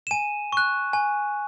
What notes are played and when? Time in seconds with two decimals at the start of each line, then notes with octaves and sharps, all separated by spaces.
0.07 E7
0.11 G#5 D#7
0.52 C#6 F#6
0.93 G#5